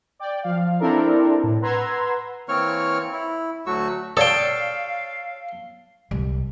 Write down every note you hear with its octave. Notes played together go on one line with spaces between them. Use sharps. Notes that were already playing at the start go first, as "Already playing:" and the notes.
D5 G5
F3 F5
C4 D4 E4 A4 A#4 D5
A2
B4 F#5 A#5 C6 E6 G#6
E3 A#3 C4 C#5 C#6 F6
E4
D2 F#3 A3 F#4 C#6 E6
A4 C#5 D5 F5 G5 D#6
C2